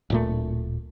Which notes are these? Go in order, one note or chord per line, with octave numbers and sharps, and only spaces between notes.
D1 A#2 A3